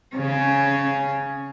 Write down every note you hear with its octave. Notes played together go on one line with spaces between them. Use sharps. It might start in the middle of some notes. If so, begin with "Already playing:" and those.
C#3 C#4